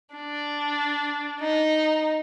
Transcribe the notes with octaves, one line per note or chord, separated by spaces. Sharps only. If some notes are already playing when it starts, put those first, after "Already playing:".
D4
D#4